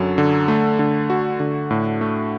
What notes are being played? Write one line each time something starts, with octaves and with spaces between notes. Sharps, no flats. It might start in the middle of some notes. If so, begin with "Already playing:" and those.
Already playing: F#2 D3 F#3
D3
A3
D3
F#4
D3
A2
A3